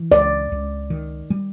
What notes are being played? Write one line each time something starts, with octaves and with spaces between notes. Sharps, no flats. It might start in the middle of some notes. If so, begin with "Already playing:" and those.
Already playing: E3
C#2 D5
C#2
D#3
G3